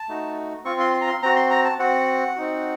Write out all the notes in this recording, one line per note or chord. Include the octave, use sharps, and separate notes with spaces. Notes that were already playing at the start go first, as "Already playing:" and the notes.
Already playing: A5
A3 D#4 F#4
C4 F4 C#6
C6
C6
A#5
C6
C4 F#4 A#5
C6
A#5
A5
C4 F#4 F#5
C4 D#4 F#4